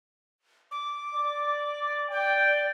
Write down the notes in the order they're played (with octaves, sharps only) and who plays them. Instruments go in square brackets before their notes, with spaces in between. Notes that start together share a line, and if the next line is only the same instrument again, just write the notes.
[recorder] D6
[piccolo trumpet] D5
[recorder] D5 [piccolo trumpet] G5